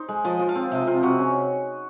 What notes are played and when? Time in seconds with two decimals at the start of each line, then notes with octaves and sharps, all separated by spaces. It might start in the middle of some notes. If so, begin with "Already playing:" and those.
Already playing: D#4 C5
0.08 G#3
0.25 F3 D#5
0.39 F3
0.49 F5
0.56 C4
0.72 C3 D#5
0.87 C4 F4
1.03 C3 F#4
1.19 C#4